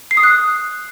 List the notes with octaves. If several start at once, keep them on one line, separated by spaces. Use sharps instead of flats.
C7
D#6
F#6